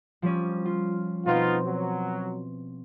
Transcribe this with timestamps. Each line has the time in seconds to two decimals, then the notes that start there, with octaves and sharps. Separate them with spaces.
0.22 F3 G3 C#4
0.65 F4
1.26 B2 B3 C4 D#4 F4
1.65 F#3